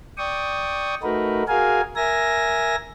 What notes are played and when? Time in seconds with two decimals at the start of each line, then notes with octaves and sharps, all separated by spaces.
0.17 D5 G5 C#6 D#6
1.03 A3 D#4 F#4 A#4 B4
1.48 F#4 G#4 A#4 F5 G#5
1.96 A#4 E5 G#5 A#6